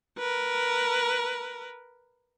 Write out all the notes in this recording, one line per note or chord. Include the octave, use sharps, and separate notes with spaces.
A#4 B4